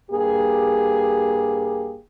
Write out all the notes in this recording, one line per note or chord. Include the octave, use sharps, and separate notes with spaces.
G2 A#3 G4 G#4